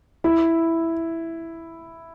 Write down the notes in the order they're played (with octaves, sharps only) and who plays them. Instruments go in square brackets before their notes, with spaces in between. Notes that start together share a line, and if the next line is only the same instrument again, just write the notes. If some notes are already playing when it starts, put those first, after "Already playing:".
[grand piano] E4